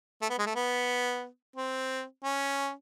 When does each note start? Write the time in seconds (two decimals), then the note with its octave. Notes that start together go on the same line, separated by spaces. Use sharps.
0.22 A3
0.30 B3
0.38 G#3
0.46 A3
0.55 B3
1.56 C4
2.24 C#4